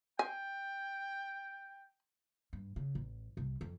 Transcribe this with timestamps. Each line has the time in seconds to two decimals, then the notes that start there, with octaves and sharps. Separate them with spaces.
0.19 G5 G#5
2.53 G2
2.76 C#3
2.95 A1
3.37 C2
3.61 F2